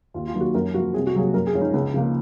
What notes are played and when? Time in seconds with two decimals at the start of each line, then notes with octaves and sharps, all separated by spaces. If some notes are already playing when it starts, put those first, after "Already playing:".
0.14 D#2 F4
0.28 F4
0.34 D#3 F#3 A#3
0.41 F#4
0.55 F#2 A#4
0.74 F3 A#3 F#4
0.94 C2 G#4
1.07 F#4
1.14 C3 F#3 A#3 G#4
1.34 F#2 A#4
1.47 G#4
1.54 F3 G#3 C#4
1.61 D#4
1.73 C#2
1.94 C#3 F3 A#3